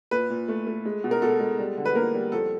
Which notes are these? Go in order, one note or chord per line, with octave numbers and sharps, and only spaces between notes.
A#2 B4
A#2
A3
A3
G#3
B2
A#4
B2 A4
G#3
G3
D3
B4
A#3 A#4
G3
F2 A4